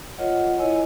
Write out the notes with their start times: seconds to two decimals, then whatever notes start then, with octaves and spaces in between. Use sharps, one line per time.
0.18 F4 A#4 C#5 D#5 F#5
0.59 E4 A#4 C#5 D#5 G#5